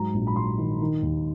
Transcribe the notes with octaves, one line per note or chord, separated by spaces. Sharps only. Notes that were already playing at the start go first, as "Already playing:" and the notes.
Already playing: G#2 F#3 A#5
A#1
B5
F#3 C6
D#3
D#3
D#2